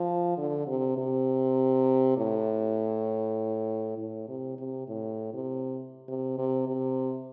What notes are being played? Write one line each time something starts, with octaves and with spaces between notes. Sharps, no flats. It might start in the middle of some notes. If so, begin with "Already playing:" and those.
Already playing: F3
D3
C3
C3
A2
A2
C3
C3
A2
C3
C3
C3
C3